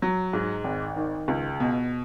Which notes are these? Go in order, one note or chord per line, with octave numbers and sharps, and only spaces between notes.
F#3
G#2
G#1
D#3
C#2
B2